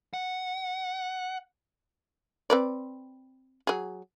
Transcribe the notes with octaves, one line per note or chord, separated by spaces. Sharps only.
F#5
C4 B4 D5
F#3 G#4